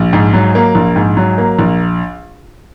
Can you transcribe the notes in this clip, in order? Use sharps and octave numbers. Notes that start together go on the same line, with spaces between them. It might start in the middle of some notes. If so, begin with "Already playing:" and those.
Already playing: A#1
G#2
F#3
A#3
A#1
G#2
F#3
A#3
A#1